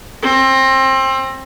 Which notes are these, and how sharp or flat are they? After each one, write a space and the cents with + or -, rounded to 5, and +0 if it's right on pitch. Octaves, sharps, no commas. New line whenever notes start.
C4 +25